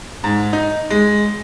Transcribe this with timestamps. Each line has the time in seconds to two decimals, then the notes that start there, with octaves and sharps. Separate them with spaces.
0.24 G#2
0.53 D#4
0.90 G#3